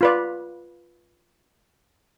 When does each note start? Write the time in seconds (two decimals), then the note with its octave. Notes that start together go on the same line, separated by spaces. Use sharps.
0.01 F4 B4 D5